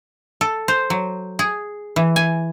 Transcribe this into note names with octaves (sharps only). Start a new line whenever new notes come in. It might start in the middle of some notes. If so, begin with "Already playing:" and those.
A4
C5
F#3
G#4
E3
G#5